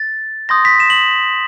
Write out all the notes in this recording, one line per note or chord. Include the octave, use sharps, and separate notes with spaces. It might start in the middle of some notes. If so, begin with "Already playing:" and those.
Already playing: A6
C6 D#6 G6 A#6
B6
E7
F#7